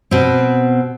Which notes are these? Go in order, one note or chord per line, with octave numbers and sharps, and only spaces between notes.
B2 C4